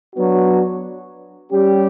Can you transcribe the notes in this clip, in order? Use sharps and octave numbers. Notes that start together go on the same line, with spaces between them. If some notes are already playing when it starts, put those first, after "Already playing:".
F#3 B3 D4 F#4
G3 C#4 G4